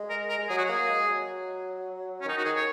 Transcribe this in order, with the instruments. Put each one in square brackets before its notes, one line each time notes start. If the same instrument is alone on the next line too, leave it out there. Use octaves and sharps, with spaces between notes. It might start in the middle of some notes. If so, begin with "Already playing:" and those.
Already playing: [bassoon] G#3
[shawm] A#4
A#4
[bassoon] G#3
[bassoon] F#3 [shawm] G#4
[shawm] F#4
[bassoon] A#3 [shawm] G#4
[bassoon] G#3
F#3
[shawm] C#4
[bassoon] D#3 [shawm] D#4
[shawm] F#4
[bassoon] D#3 [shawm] G#4
[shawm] C#5